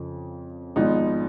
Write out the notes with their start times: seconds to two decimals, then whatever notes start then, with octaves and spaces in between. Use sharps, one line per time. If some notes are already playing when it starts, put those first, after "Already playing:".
Already playing: F2 C#3 F3
0.76 G#1 G#2 F3 B3 D#4